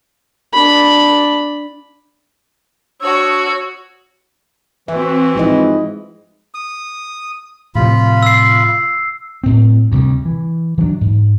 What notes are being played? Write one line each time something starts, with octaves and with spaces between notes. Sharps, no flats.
D4 B5
D4 F#4 C#5 D#6 E6
E3 C4 F#4 E5
G#2 F3 E4 D#5
D#6
A2 C3 F3 F4 B5
E6 C7
A2 C4
D2 C3 G3
E3
E3 F#3 C#4 D4
G#2